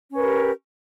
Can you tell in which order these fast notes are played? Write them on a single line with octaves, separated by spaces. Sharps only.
C#4 B4 A#4 G4